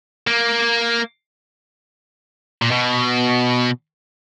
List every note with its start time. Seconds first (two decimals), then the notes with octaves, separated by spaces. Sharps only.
0.27 A#3
2.62 A#2
2.71 B2